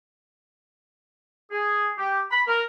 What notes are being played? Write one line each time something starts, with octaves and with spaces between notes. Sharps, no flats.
G#4
G4
B5
A#4